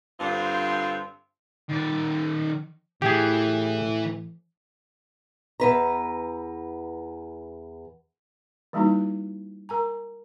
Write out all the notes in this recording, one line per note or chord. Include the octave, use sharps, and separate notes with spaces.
G2 D3 C4 F4 C5
D#3 D5
A2 E3 G4 G#4
E2 B4 A#5
E3 G3 A#3 D#4 E4 F#4
A#4 G#5 A#5